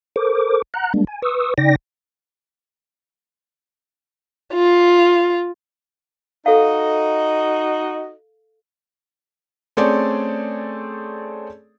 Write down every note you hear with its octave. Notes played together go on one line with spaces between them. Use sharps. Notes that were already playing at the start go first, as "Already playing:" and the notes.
A4 A#4 C5 D6
F#5 A#5 F#6
G3 G#3 A#3 D4
G#5
B4 C#6 D#6 E6
C#3 D#4 D5 G5 A#6
F4
D#4 F#4 A4 D#5 F5
A3 C4 C#4 G#4 A4 D5